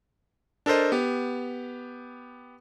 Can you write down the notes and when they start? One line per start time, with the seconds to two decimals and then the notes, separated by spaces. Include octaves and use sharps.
0.66 D4 A4 A#4 C5 D#5
0.92 B3 G4